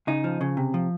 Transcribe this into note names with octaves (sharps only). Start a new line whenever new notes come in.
C#3 D#4
F3
C#3
C3
F3